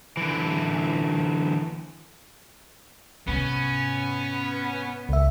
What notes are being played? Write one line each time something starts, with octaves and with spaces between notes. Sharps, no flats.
D3 E3
G#2 C3 B3 C#4
C#2 E5